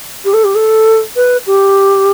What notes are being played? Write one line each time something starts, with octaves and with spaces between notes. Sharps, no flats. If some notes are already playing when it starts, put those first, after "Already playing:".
G4
A4
G4
A4
B4
G4